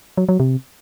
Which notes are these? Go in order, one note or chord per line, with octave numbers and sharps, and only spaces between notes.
F#3
F#3
C3